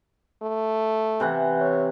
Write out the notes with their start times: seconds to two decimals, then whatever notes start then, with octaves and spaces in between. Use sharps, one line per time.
0.42 A3
1.20 C3 E3 F#5
1.61 C#5